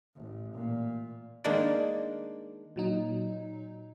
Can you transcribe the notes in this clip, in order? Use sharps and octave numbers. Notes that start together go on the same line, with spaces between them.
A1
A#2
D#3 G#3 A#3 D4 D5
A#2 F#3 D#4